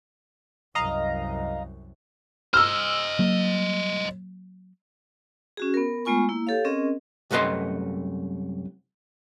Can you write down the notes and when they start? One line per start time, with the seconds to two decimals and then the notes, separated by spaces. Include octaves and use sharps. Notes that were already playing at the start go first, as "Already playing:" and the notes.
0.75 C2 F#2 D#5 F5 A#5
2.54 C5 D#5 E6 F6
3.19 F#3 A#3
5.57 C#4 F#4 G#4
5.74 B3 A#4
6.05 G#3 A3 B3 F4 G#5 C#6
6.29 A#3 E4
6.47 G4 A4 C#5 F5
6.65 C4 C#4 G#4 A#4 D#5
7.31 C2 F#2 A3 B4 D#5 C6